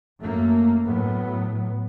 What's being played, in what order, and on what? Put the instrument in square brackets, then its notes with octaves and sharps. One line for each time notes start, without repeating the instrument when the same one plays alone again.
[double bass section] F#2 A3 A#3
A2 F#3 B3